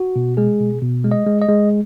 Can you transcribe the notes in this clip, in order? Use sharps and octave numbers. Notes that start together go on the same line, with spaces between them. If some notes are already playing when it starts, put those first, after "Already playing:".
Already playing: F#4
B2
G#3 G#4
B2
B2
G#3
D#5
G#3
D#5
G#3